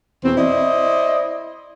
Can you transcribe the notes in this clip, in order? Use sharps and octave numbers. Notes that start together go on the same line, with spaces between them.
E2 B2 C4
E4 C5 D5 D#5